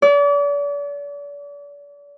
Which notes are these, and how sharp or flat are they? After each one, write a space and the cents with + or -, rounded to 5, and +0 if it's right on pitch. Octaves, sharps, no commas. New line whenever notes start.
D5 -40